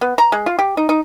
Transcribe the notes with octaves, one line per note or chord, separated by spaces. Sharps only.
B3
A#5
G#3
F4
G4
D#4
D#4